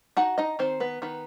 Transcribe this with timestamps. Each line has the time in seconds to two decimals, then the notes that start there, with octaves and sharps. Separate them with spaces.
0.17 D#4 F#4 F#5
0.38 D#4 D#5
0.59 D#3 C4 C5
0.80 B3 B4
1.02 D#3 B3 B4